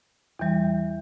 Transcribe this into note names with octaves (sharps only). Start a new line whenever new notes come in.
E2 E3 G3